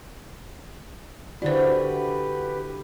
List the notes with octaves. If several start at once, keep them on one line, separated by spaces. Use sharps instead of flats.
D3 E4 F#4 G4 B4 C5 D5